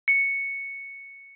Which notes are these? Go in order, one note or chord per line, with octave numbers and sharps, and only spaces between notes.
C#7